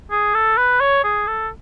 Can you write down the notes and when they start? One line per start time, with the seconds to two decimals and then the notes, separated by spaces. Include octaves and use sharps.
0.11 G#4
0.35 A4
0.57 B4
0.81 C#5
1.04 G#4
1.28 A4